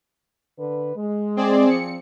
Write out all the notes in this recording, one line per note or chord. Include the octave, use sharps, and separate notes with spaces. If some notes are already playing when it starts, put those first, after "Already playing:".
D3 B4
G#3
C4 G#4 D5
F3 C4 C#7